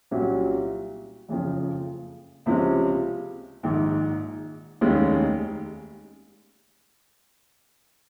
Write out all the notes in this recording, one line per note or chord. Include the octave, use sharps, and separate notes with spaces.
C2 A#2 F#3 C#4 F#4
F#1 F2 C#3 F3
C#2 C3 F3 G#3 C#4
A#1 G#2 D#3
F1 D#2 D#3 G#3 C#4